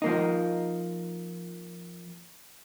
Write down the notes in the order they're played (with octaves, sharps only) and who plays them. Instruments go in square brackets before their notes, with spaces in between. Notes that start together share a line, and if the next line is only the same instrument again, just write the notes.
[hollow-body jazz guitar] F3 A#3 D#4